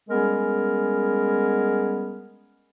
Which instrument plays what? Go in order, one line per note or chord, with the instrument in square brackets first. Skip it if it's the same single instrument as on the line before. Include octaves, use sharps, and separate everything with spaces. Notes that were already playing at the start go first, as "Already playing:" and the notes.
[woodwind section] G3 G#3 B3 C#4 G#4 A#4